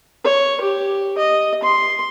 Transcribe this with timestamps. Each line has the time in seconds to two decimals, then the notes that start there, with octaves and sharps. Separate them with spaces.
0.24 C#5
0.61 G4
1.18 D#5
1.63 C6